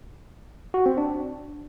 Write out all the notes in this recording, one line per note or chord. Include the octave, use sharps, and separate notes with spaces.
F#4
C4
D4